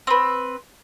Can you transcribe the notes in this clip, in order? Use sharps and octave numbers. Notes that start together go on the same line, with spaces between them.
C4 B4